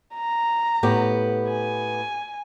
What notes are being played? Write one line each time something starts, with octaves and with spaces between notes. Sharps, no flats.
A#5
A2 B3 G4
G#5